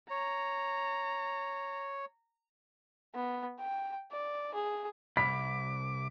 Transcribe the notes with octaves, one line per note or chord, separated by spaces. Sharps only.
C#5 A#5
B3
G5
D5
G#4
C2 B5 D6 B6